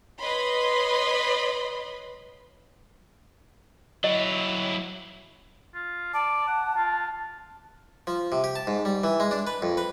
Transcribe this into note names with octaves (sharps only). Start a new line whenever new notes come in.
B4 C#5 D#5 B5 C6
F#3 E4 D#5
F4
D5 A5
F#5
F4
F3
C3
G4
A5
G#2
G3
E3
G#3
D4
B4
F2
B4